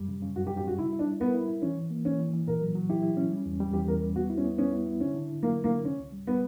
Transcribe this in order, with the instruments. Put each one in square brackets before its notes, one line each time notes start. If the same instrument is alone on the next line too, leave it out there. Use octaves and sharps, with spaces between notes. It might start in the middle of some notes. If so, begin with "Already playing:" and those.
Already playing: [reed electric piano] F#2 G3
C#3
C#3
[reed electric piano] F#2 [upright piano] F#4
[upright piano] G4
[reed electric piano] C#3
[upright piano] G4
[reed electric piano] C#3 [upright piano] F#4
[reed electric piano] G3 [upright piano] E4
[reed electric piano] E4
[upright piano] D4
[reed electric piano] G3
[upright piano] B3 [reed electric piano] A#4
[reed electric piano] E4
E4
[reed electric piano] E3 [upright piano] C#4
[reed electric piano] E3
A#3
[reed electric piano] E3 [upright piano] C#4
[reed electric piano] E3
E3
[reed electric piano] A#2 [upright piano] A#4
[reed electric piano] F#3
F#3
[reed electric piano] E4 [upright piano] G4
[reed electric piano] E4
C#4
G3
E2
G3
[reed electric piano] E2 [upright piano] G4
[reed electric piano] E2 [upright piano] A#4
[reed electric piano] G3
[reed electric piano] B3 [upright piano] F#4
[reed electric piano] E4
[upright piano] C#4
[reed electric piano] B3
[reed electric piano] B3 [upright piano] C#4
[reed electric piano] E4
E4
[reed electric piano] D3 [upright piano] C#4
[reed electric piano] D3
D3
[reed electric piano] F#3 [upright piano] A#3
[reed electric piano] F#3
[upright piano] A#3
[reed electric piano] D3
[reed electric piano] C#3 [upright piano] C#4
[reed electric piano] C#2
G3
[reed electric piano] G3 [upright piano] B3